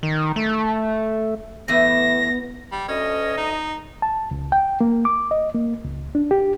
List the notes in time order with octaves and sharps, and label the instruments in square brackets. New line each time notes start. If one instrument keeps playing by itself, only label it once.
[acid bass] D#3
A3
[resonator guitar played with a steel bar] E2 A2 E5 [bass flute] B3 [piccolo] A#6
[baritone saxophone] G3
[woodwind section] D2 D#5 [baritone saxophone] C#4
[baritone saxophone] D#4
[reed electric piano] A5
C#2
G5
A#3
D6
D#5
A#3
C#2
D4
G4